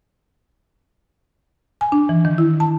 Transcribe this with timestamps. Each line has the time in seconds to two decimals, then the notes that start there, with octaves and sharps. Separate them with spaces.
1.81 G#5
1.92 D4
2.09 E3
2.25 D#3
2.38 E4
2.60 A5